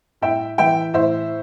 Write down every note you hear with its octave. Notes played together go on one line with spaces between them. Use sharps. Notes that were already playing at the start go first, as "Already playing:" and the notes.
A2 E5 G5
E3 E5 G5
A2 C5 E5